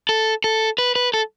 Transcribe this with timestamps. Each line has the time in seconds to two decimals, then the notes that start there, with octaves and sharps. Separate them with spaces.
0.09 A4
0.44 A4
0.78 B4
0.96 B4
1.14 A4